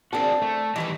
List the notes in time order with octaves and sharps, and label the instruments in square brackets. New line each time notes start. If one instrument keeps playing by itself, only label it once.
[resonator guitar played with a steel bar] C4 D4 [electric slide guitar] F#4 G#4 A#4 [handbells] A5
[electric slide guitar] A3
[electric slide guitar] D#3 G3 D#5 [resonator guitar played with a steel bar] E3 G4 B4